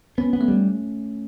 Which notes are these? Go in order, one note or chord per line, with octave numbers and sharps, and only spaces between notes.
B3 C#4
B3
A3
G3